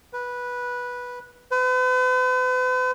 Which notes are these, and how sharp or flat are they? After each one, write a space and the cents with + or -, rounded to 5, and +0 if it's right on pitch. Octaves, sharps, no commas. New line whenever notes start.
B4 -10
B4 +45